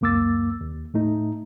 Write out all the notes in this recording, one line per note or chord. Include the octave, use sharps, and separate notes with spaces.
C#2 F#2 A#3 D6 E6 A6
D#2
A2 A3 D#4